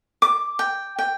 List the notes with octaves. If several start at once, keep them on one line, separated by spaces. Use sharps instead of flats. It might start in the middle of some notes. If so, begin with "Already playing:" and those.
D6
G5
G5